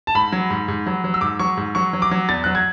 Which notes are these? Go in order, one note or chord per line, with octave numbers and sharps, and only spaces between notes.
A5
G#2 B5
F#3
G#2
G#2
F#3
F#3
E6
G#2 D6
F#3 C#6
G#2
F#3 C#6
F#3
D6
F#3
E2 A6
F#3 F#6
G#6